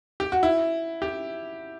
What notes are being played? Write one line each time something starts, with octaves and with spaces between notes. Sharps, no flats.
G4
F#4
E4
G4